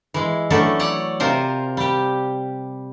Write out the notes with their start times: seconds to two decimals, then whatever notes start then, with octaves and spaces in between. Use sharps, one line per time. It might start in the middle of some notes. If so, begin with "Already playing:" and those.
0.14 E3 G#3
0.50 E3 F#3 A3 C#4 D4 A4
0.79 C#5 D5 F#5
1.20 C3 F4 A#4 C5
1.77 G3 G4